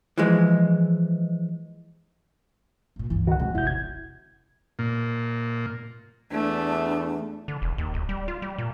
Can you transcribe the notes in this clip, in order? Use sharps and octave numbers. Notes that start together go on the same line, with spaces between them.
E3 F3 G#3
C2 A#2
C#2 G2 E3
D3 D#3 F#4 F#5
B2 F3 G#3 C4
E1 A1 F2 C3 E4 G6
D3 G#6
A#2
E2 A3 D4
D3
E1
D#2
D1
G3
F4
G3
A#2